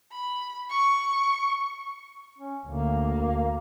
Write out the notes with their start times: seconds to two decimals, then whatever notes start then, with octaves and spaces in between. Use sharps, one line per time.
0.12 B5
0.70 C#6
2.38 C#4
2.67 D2 A#3